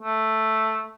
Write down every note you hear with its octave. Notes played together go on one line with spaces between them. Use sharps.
A3